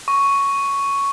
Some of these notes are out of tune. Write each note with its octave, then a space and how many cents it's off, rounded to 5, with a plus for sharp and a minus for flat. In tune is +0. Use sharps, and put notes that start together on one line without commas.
C#6 +5